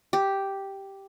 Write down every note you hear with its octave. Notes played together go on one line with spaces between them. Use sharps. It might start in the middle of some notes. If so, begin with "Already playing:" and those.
G4